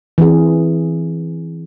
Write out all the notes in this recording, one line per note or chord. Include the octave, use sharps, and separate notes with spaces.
E3 C4 G#4